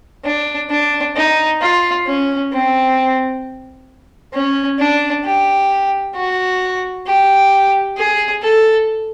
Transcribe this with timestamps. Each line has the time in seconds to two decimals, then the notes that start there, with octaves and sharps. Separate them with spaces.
0.25 D4
0.70 D4
1.16 D#4
1.61 F4
2.06 C#4
2.52 C4
4.34 C#4
4.79 D4
5.24 G4
6.15 F#4
7.06 G4
7.97 G#4
8.42 A4